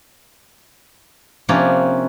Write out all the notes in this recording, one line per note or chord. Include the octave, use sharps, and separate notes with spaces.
C3 F3 A#3 C#4 D4